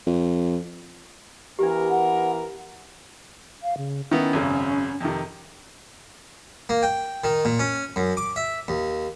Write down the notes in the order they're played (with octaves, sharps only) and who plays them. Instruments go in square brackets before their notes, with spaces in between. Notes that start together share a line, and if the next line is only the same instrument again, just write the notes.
[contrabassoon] F2
[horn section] E3 B3 A#4 [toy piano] D4 G4
[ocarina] F#5
[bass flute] F5
C#3
[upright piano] D#3 B3 E4 [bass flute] C#4
[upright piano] G#1 F#2 C#3
F2 C3 D#3
[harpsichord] A#3
G5
D#3
A#2
C#4
F#2
D6
E5
D#2